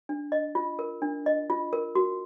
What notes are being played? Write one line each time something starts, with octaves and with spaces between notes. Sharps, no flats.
D4
D#5
F4
A#4
D4
D#5
F4
A#4
F#4